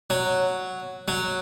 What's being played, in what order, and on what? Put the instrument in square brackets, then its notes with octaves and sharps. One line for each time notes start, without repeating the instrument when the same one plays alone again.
[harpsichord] F#3
F#3